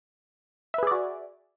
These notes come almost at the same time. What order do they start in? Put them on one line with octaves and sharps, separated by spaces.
E5 B4 G#4 D5 F#4